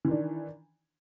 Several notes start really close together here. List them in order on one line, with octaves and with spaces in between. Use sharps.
E3 D#3 D4